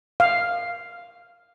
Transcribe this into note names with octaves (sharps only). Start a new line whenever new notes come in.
F5